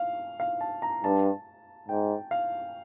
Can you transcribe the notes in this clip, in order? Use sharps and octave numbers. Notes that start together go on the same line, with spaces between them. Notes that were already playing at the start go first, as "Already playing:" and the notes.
Already playing: F5
F5
A5
A#5
G2 A5
G#2 G5
F5